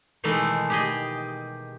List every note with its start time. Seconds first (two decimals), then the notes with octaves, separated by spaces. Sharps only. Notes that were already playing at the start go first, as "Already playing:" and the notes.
0.24 B2 D#3 E3 G#3 A3
0.70 G4 G#4 D#5